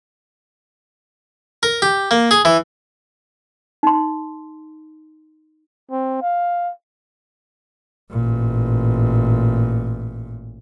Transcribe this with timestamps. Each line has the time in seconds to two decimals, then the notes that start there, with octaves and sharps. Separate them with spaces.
1.63 A#4
1.82 G4
2.11 A#3
2.31 G#4
2.45 E3
3.83 D#4 C6
5.91 C4
6.22 F5
8.11 A1 A#2